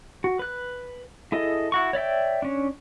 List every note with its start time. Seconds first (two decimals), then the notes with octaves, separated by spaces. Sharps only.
0.24 F#4
0.39 B4 F#6
1.32 E4 G#4 A4 D#5
1.72 E4 F#4 C#6
1.93 C#5 D5 E5 G5
2.42 C#4 D4